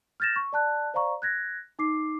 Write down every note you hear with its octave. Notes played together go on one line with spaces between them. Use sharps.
F6 G6 A6 A#6 E7
C#6
D5 A5 F#6
C5 D5 F5 A#5 C#6
F#6 G#6 A#6
D#4 D6 C7